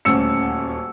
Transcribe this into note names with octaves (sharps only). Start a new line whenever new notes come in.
D#1 D2 C#4 E6 C#7